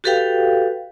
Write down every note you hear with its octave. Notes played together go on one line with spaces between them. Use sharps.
F#4 G4 A4 B4 F5 G5